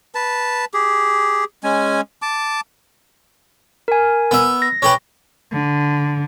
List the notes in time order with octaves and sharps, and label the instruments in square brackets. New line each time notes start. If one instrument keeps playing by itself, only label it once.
[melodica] B4 A5
G4 G#4
G#3 C#4 G#5
A5 D6
[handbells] A#4 G#5
[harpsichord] B3 E5
[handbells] A#6
[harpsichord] C#4 G4 B4
[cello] D3